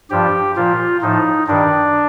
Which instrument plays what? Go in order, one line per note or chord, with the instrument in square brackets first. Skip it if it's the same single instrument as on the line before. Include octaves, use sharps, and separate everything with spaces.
[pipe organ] G2 F3 G4
A#2 F3 F4
A2 F3 D#4
G2 D#3 D4